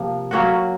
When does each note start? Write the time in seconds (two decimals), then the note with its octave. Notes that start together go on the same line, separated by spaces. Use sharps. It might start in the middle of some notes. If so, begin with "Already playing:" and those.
Already playing: C3 F3 A#3
0.31 F#3 A#3 C#4 F#4